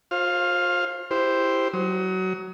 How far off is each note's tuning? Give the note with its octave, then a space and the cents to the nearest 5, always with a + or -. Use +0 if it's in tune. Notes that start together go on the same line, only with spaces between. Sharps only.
F4 +35 C5 +35 F5 +0
E4 +0 G4 +0 C5 +0
F#3 +20 D#6 +40